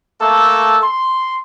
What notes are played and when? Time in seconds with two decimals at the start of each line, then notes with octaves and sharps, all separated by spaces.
0.22 A3 A#3 A4
0.83 C6